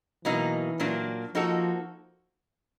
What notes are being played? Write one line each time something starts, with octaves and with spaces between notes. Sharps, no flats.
B2 E3 F#3 A#3 D#4
A#2 F#3 A#3 D4
F3 A#3 D#4 F#4 A4